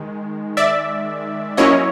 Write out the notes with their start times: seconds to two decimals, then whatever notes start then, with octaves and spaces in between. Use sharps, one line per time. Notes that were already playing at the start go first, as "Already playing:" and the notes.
Already playing: D#3 G#3
0.57 D5 E5
1.57 F#3 A#3 C#4 E4 C#5 D#5